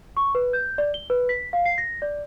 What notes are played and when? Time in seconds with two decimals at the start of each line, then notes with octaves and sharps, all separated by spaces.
0.17 C#6
0.35 B4
0.53 G6
0.78 D5
0.94 G7
1.10 B4
1.29 B6
1.53 F5
1.65 C7
1.78 A#6
2.02 D5